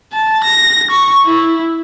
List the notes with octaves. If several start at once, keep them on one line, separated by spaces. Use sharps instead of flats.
A5
A#6
C#6
E4